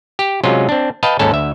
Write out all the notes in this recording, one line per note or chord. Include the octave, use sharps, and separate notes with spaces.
G4
C3 F#3 G#3 C#4 F4
C4 D4
B4 D#5 F5 G5 A5
D#2 G#2 C#4 A4 A5
D2 E5